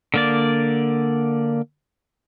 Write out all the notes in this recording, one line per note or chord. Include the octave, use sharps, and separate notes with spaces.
D3 A#3 D5